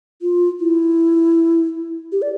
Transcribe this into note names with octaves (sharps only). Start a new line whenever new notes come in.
F4
E4
G4
D5